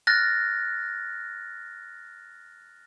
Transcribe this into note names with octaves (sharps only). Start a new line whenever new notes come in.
F6 F#6 A6 A#6